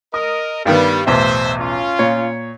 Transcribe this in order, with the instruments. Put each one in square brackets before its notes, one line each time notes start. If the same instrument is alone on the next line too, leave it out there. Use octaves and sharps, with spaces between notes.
[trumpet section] A#4 D#5 [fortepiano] D#6
[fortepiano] G2 D#3 B3 [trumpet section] G3
[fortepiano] B1 E2 A2 [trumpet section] C5 E5
[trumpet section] C#4 F4
[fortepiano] A#2 C#5